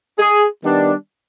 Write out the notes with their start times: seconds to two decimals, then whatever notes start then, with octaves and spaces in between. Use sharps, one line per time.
0.18 G#4
0.62 D#3 G3 B3 D4